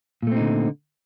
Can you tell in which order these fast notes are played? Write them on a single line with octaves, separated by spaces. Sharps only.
A#2 A3 C4 D#4 D3